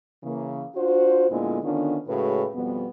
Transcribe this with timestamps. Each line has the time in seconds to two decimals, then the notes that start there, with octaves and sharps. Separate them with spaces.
0.22 C#3 E3 A#3
0.75 D4 F4 F#4 C5
1.29 D2 A#2 D3 G#3 B3 E4
1.63 D3 D#3 B3 C#4 D4 F4
2.07 A2 C#3 G#3 F#4 B4
2.53 F2 B2 G3 B3